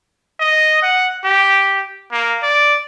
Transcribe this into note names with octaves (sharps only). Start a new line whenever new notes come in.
D#5
F#5
G4
A#3
D5